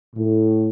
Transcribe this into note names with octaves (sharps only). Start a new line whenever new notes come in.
A2